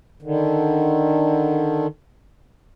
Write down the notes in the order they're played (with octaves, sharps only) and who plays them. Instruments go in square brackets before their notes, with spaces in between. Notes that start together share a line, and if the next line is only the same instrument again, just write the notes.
[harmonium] D3 D#3